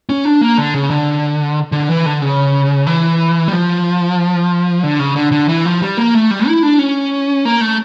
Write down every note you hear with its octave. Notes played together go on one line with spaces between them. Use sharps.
C#4
D4
A#3
D3
C#3
D3
D3
E3
D3
C#3
E3
G3
F3
D3
C#3
D3
D3
E3
F3
G3
A#3
A3
G3
E4
D4
C#4
A#3
A3